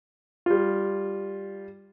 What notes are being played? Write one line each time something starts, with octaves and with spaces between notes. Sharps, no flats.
G3 F4